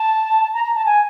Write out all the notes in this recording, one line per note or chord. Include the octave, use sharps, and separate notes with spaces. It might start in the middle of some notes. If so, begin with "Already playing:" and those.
Already playing: A5
A#5
A#5
A5
G#5